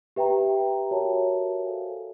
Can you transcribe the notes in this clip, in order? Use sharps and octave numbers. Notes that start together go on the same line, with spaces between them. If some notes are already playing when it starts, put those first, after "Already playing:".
G4 B4 E5 G5 A#5
F#4 A#4 C#5 E5 A5
A4 C5 F5 G#5